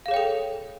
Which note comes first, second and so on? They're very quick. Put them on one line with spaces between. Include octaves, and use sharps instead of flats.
F5 G#4 C#5 G5 A4